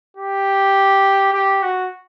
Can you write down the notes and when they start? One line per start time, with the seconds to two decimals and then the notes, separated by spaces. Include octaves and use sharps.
0.17 G4
1.33 G4
1.63 F#4